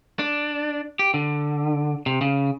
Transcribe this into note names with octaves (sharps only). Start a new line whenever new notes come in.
D4
G4
D3
C3
C#3